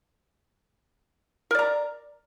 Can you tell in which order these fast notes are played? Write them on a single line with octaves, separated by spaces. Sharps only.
A#4 D5 A#5